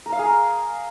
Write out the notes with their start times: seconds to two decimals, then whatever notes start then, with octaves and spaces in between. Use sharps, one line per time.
0.06 A#4
0.12 F5
0.19 G#4
0.25 A#4